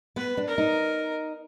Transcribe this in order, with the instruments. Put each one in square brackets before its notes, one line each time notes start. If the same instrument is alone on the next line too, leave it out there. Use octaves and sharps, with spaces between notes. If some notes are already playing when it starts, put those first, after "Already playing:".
[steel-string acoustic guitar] B3 [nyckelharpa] B4
[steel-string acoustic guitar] D4
[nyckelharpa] A#4
[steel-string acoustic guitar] D#4